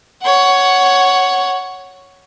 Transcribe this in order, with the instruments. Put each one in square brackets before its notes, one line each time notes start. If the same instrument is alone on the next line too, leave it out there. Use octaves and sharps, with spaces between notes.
[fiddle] C#5 F#5